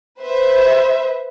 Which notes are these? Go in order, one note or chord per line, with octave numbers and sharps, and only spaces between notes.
B4 C5 E5